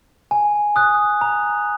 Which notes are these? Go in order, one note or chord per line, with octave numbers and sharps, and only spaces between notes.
G#5
D#6 F#6
A#5